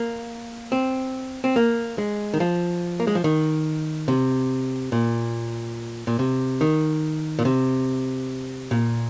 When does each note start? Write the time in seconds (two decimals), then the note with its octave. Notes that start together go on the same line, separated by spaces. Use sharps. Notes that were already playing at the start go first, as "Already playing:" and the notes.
Already playing: A#3
0.72 C4
1.44 C4
1.56 A#3
1.98 G#3
2.34 D#3
2.40 F3
3.00 A#3
3.07 G#3
3.15 F3
3.24 D#3
4.08 C3
4.92 A#2
6.07 A#2
6.19 C3
6.61 D#3
7.39 A#2
7.45 C3
8.71 A#2